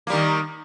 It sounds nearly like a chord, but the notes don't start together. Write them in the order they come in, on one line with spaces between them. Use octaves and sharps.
A#3 G3 D#3